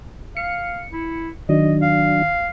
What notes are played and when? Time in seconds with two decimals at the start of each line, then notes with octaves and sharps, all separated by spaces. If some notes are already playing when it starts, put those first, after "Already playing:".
0.37 F5 C#7
0.93 E4
1.49 D#3 F#3 D4 D#5
1.82 F5